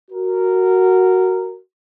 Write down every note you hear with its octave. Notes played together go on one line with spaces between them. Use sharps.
F#4 A#4